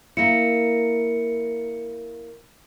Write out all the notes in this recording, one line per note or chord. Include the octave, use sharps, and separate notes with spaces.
A#3 E4 C#7